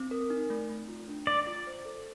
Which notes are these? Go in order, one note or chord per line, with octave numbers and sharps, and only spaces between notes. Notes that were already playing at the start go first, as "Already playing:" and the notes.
Already playing: C4
A#4
D#4
A3
A3
F4
D4
D5 F5
F4
C5
A4